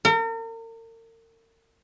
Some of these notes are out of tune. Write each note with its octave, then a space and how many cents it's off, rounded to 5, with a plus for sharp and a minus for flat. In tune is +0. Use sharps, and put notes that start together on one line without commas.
A#4 -40